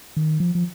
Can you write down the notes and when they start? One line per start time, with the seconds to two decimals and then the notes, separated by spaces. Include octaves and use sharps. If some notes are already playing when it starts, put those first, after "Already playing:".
0.17 D#3
0.40 F3
0.55 F3